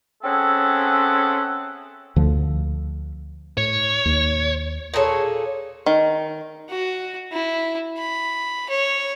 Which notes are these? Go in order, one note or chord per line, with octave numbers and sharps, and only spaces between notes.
C4 C#4 G#4 A4 E5 F#5
D2 D3 F3
A2 C#5
D#2
A#2 G#4 A4 C#5
D#3
F#4
E4
B5
C#5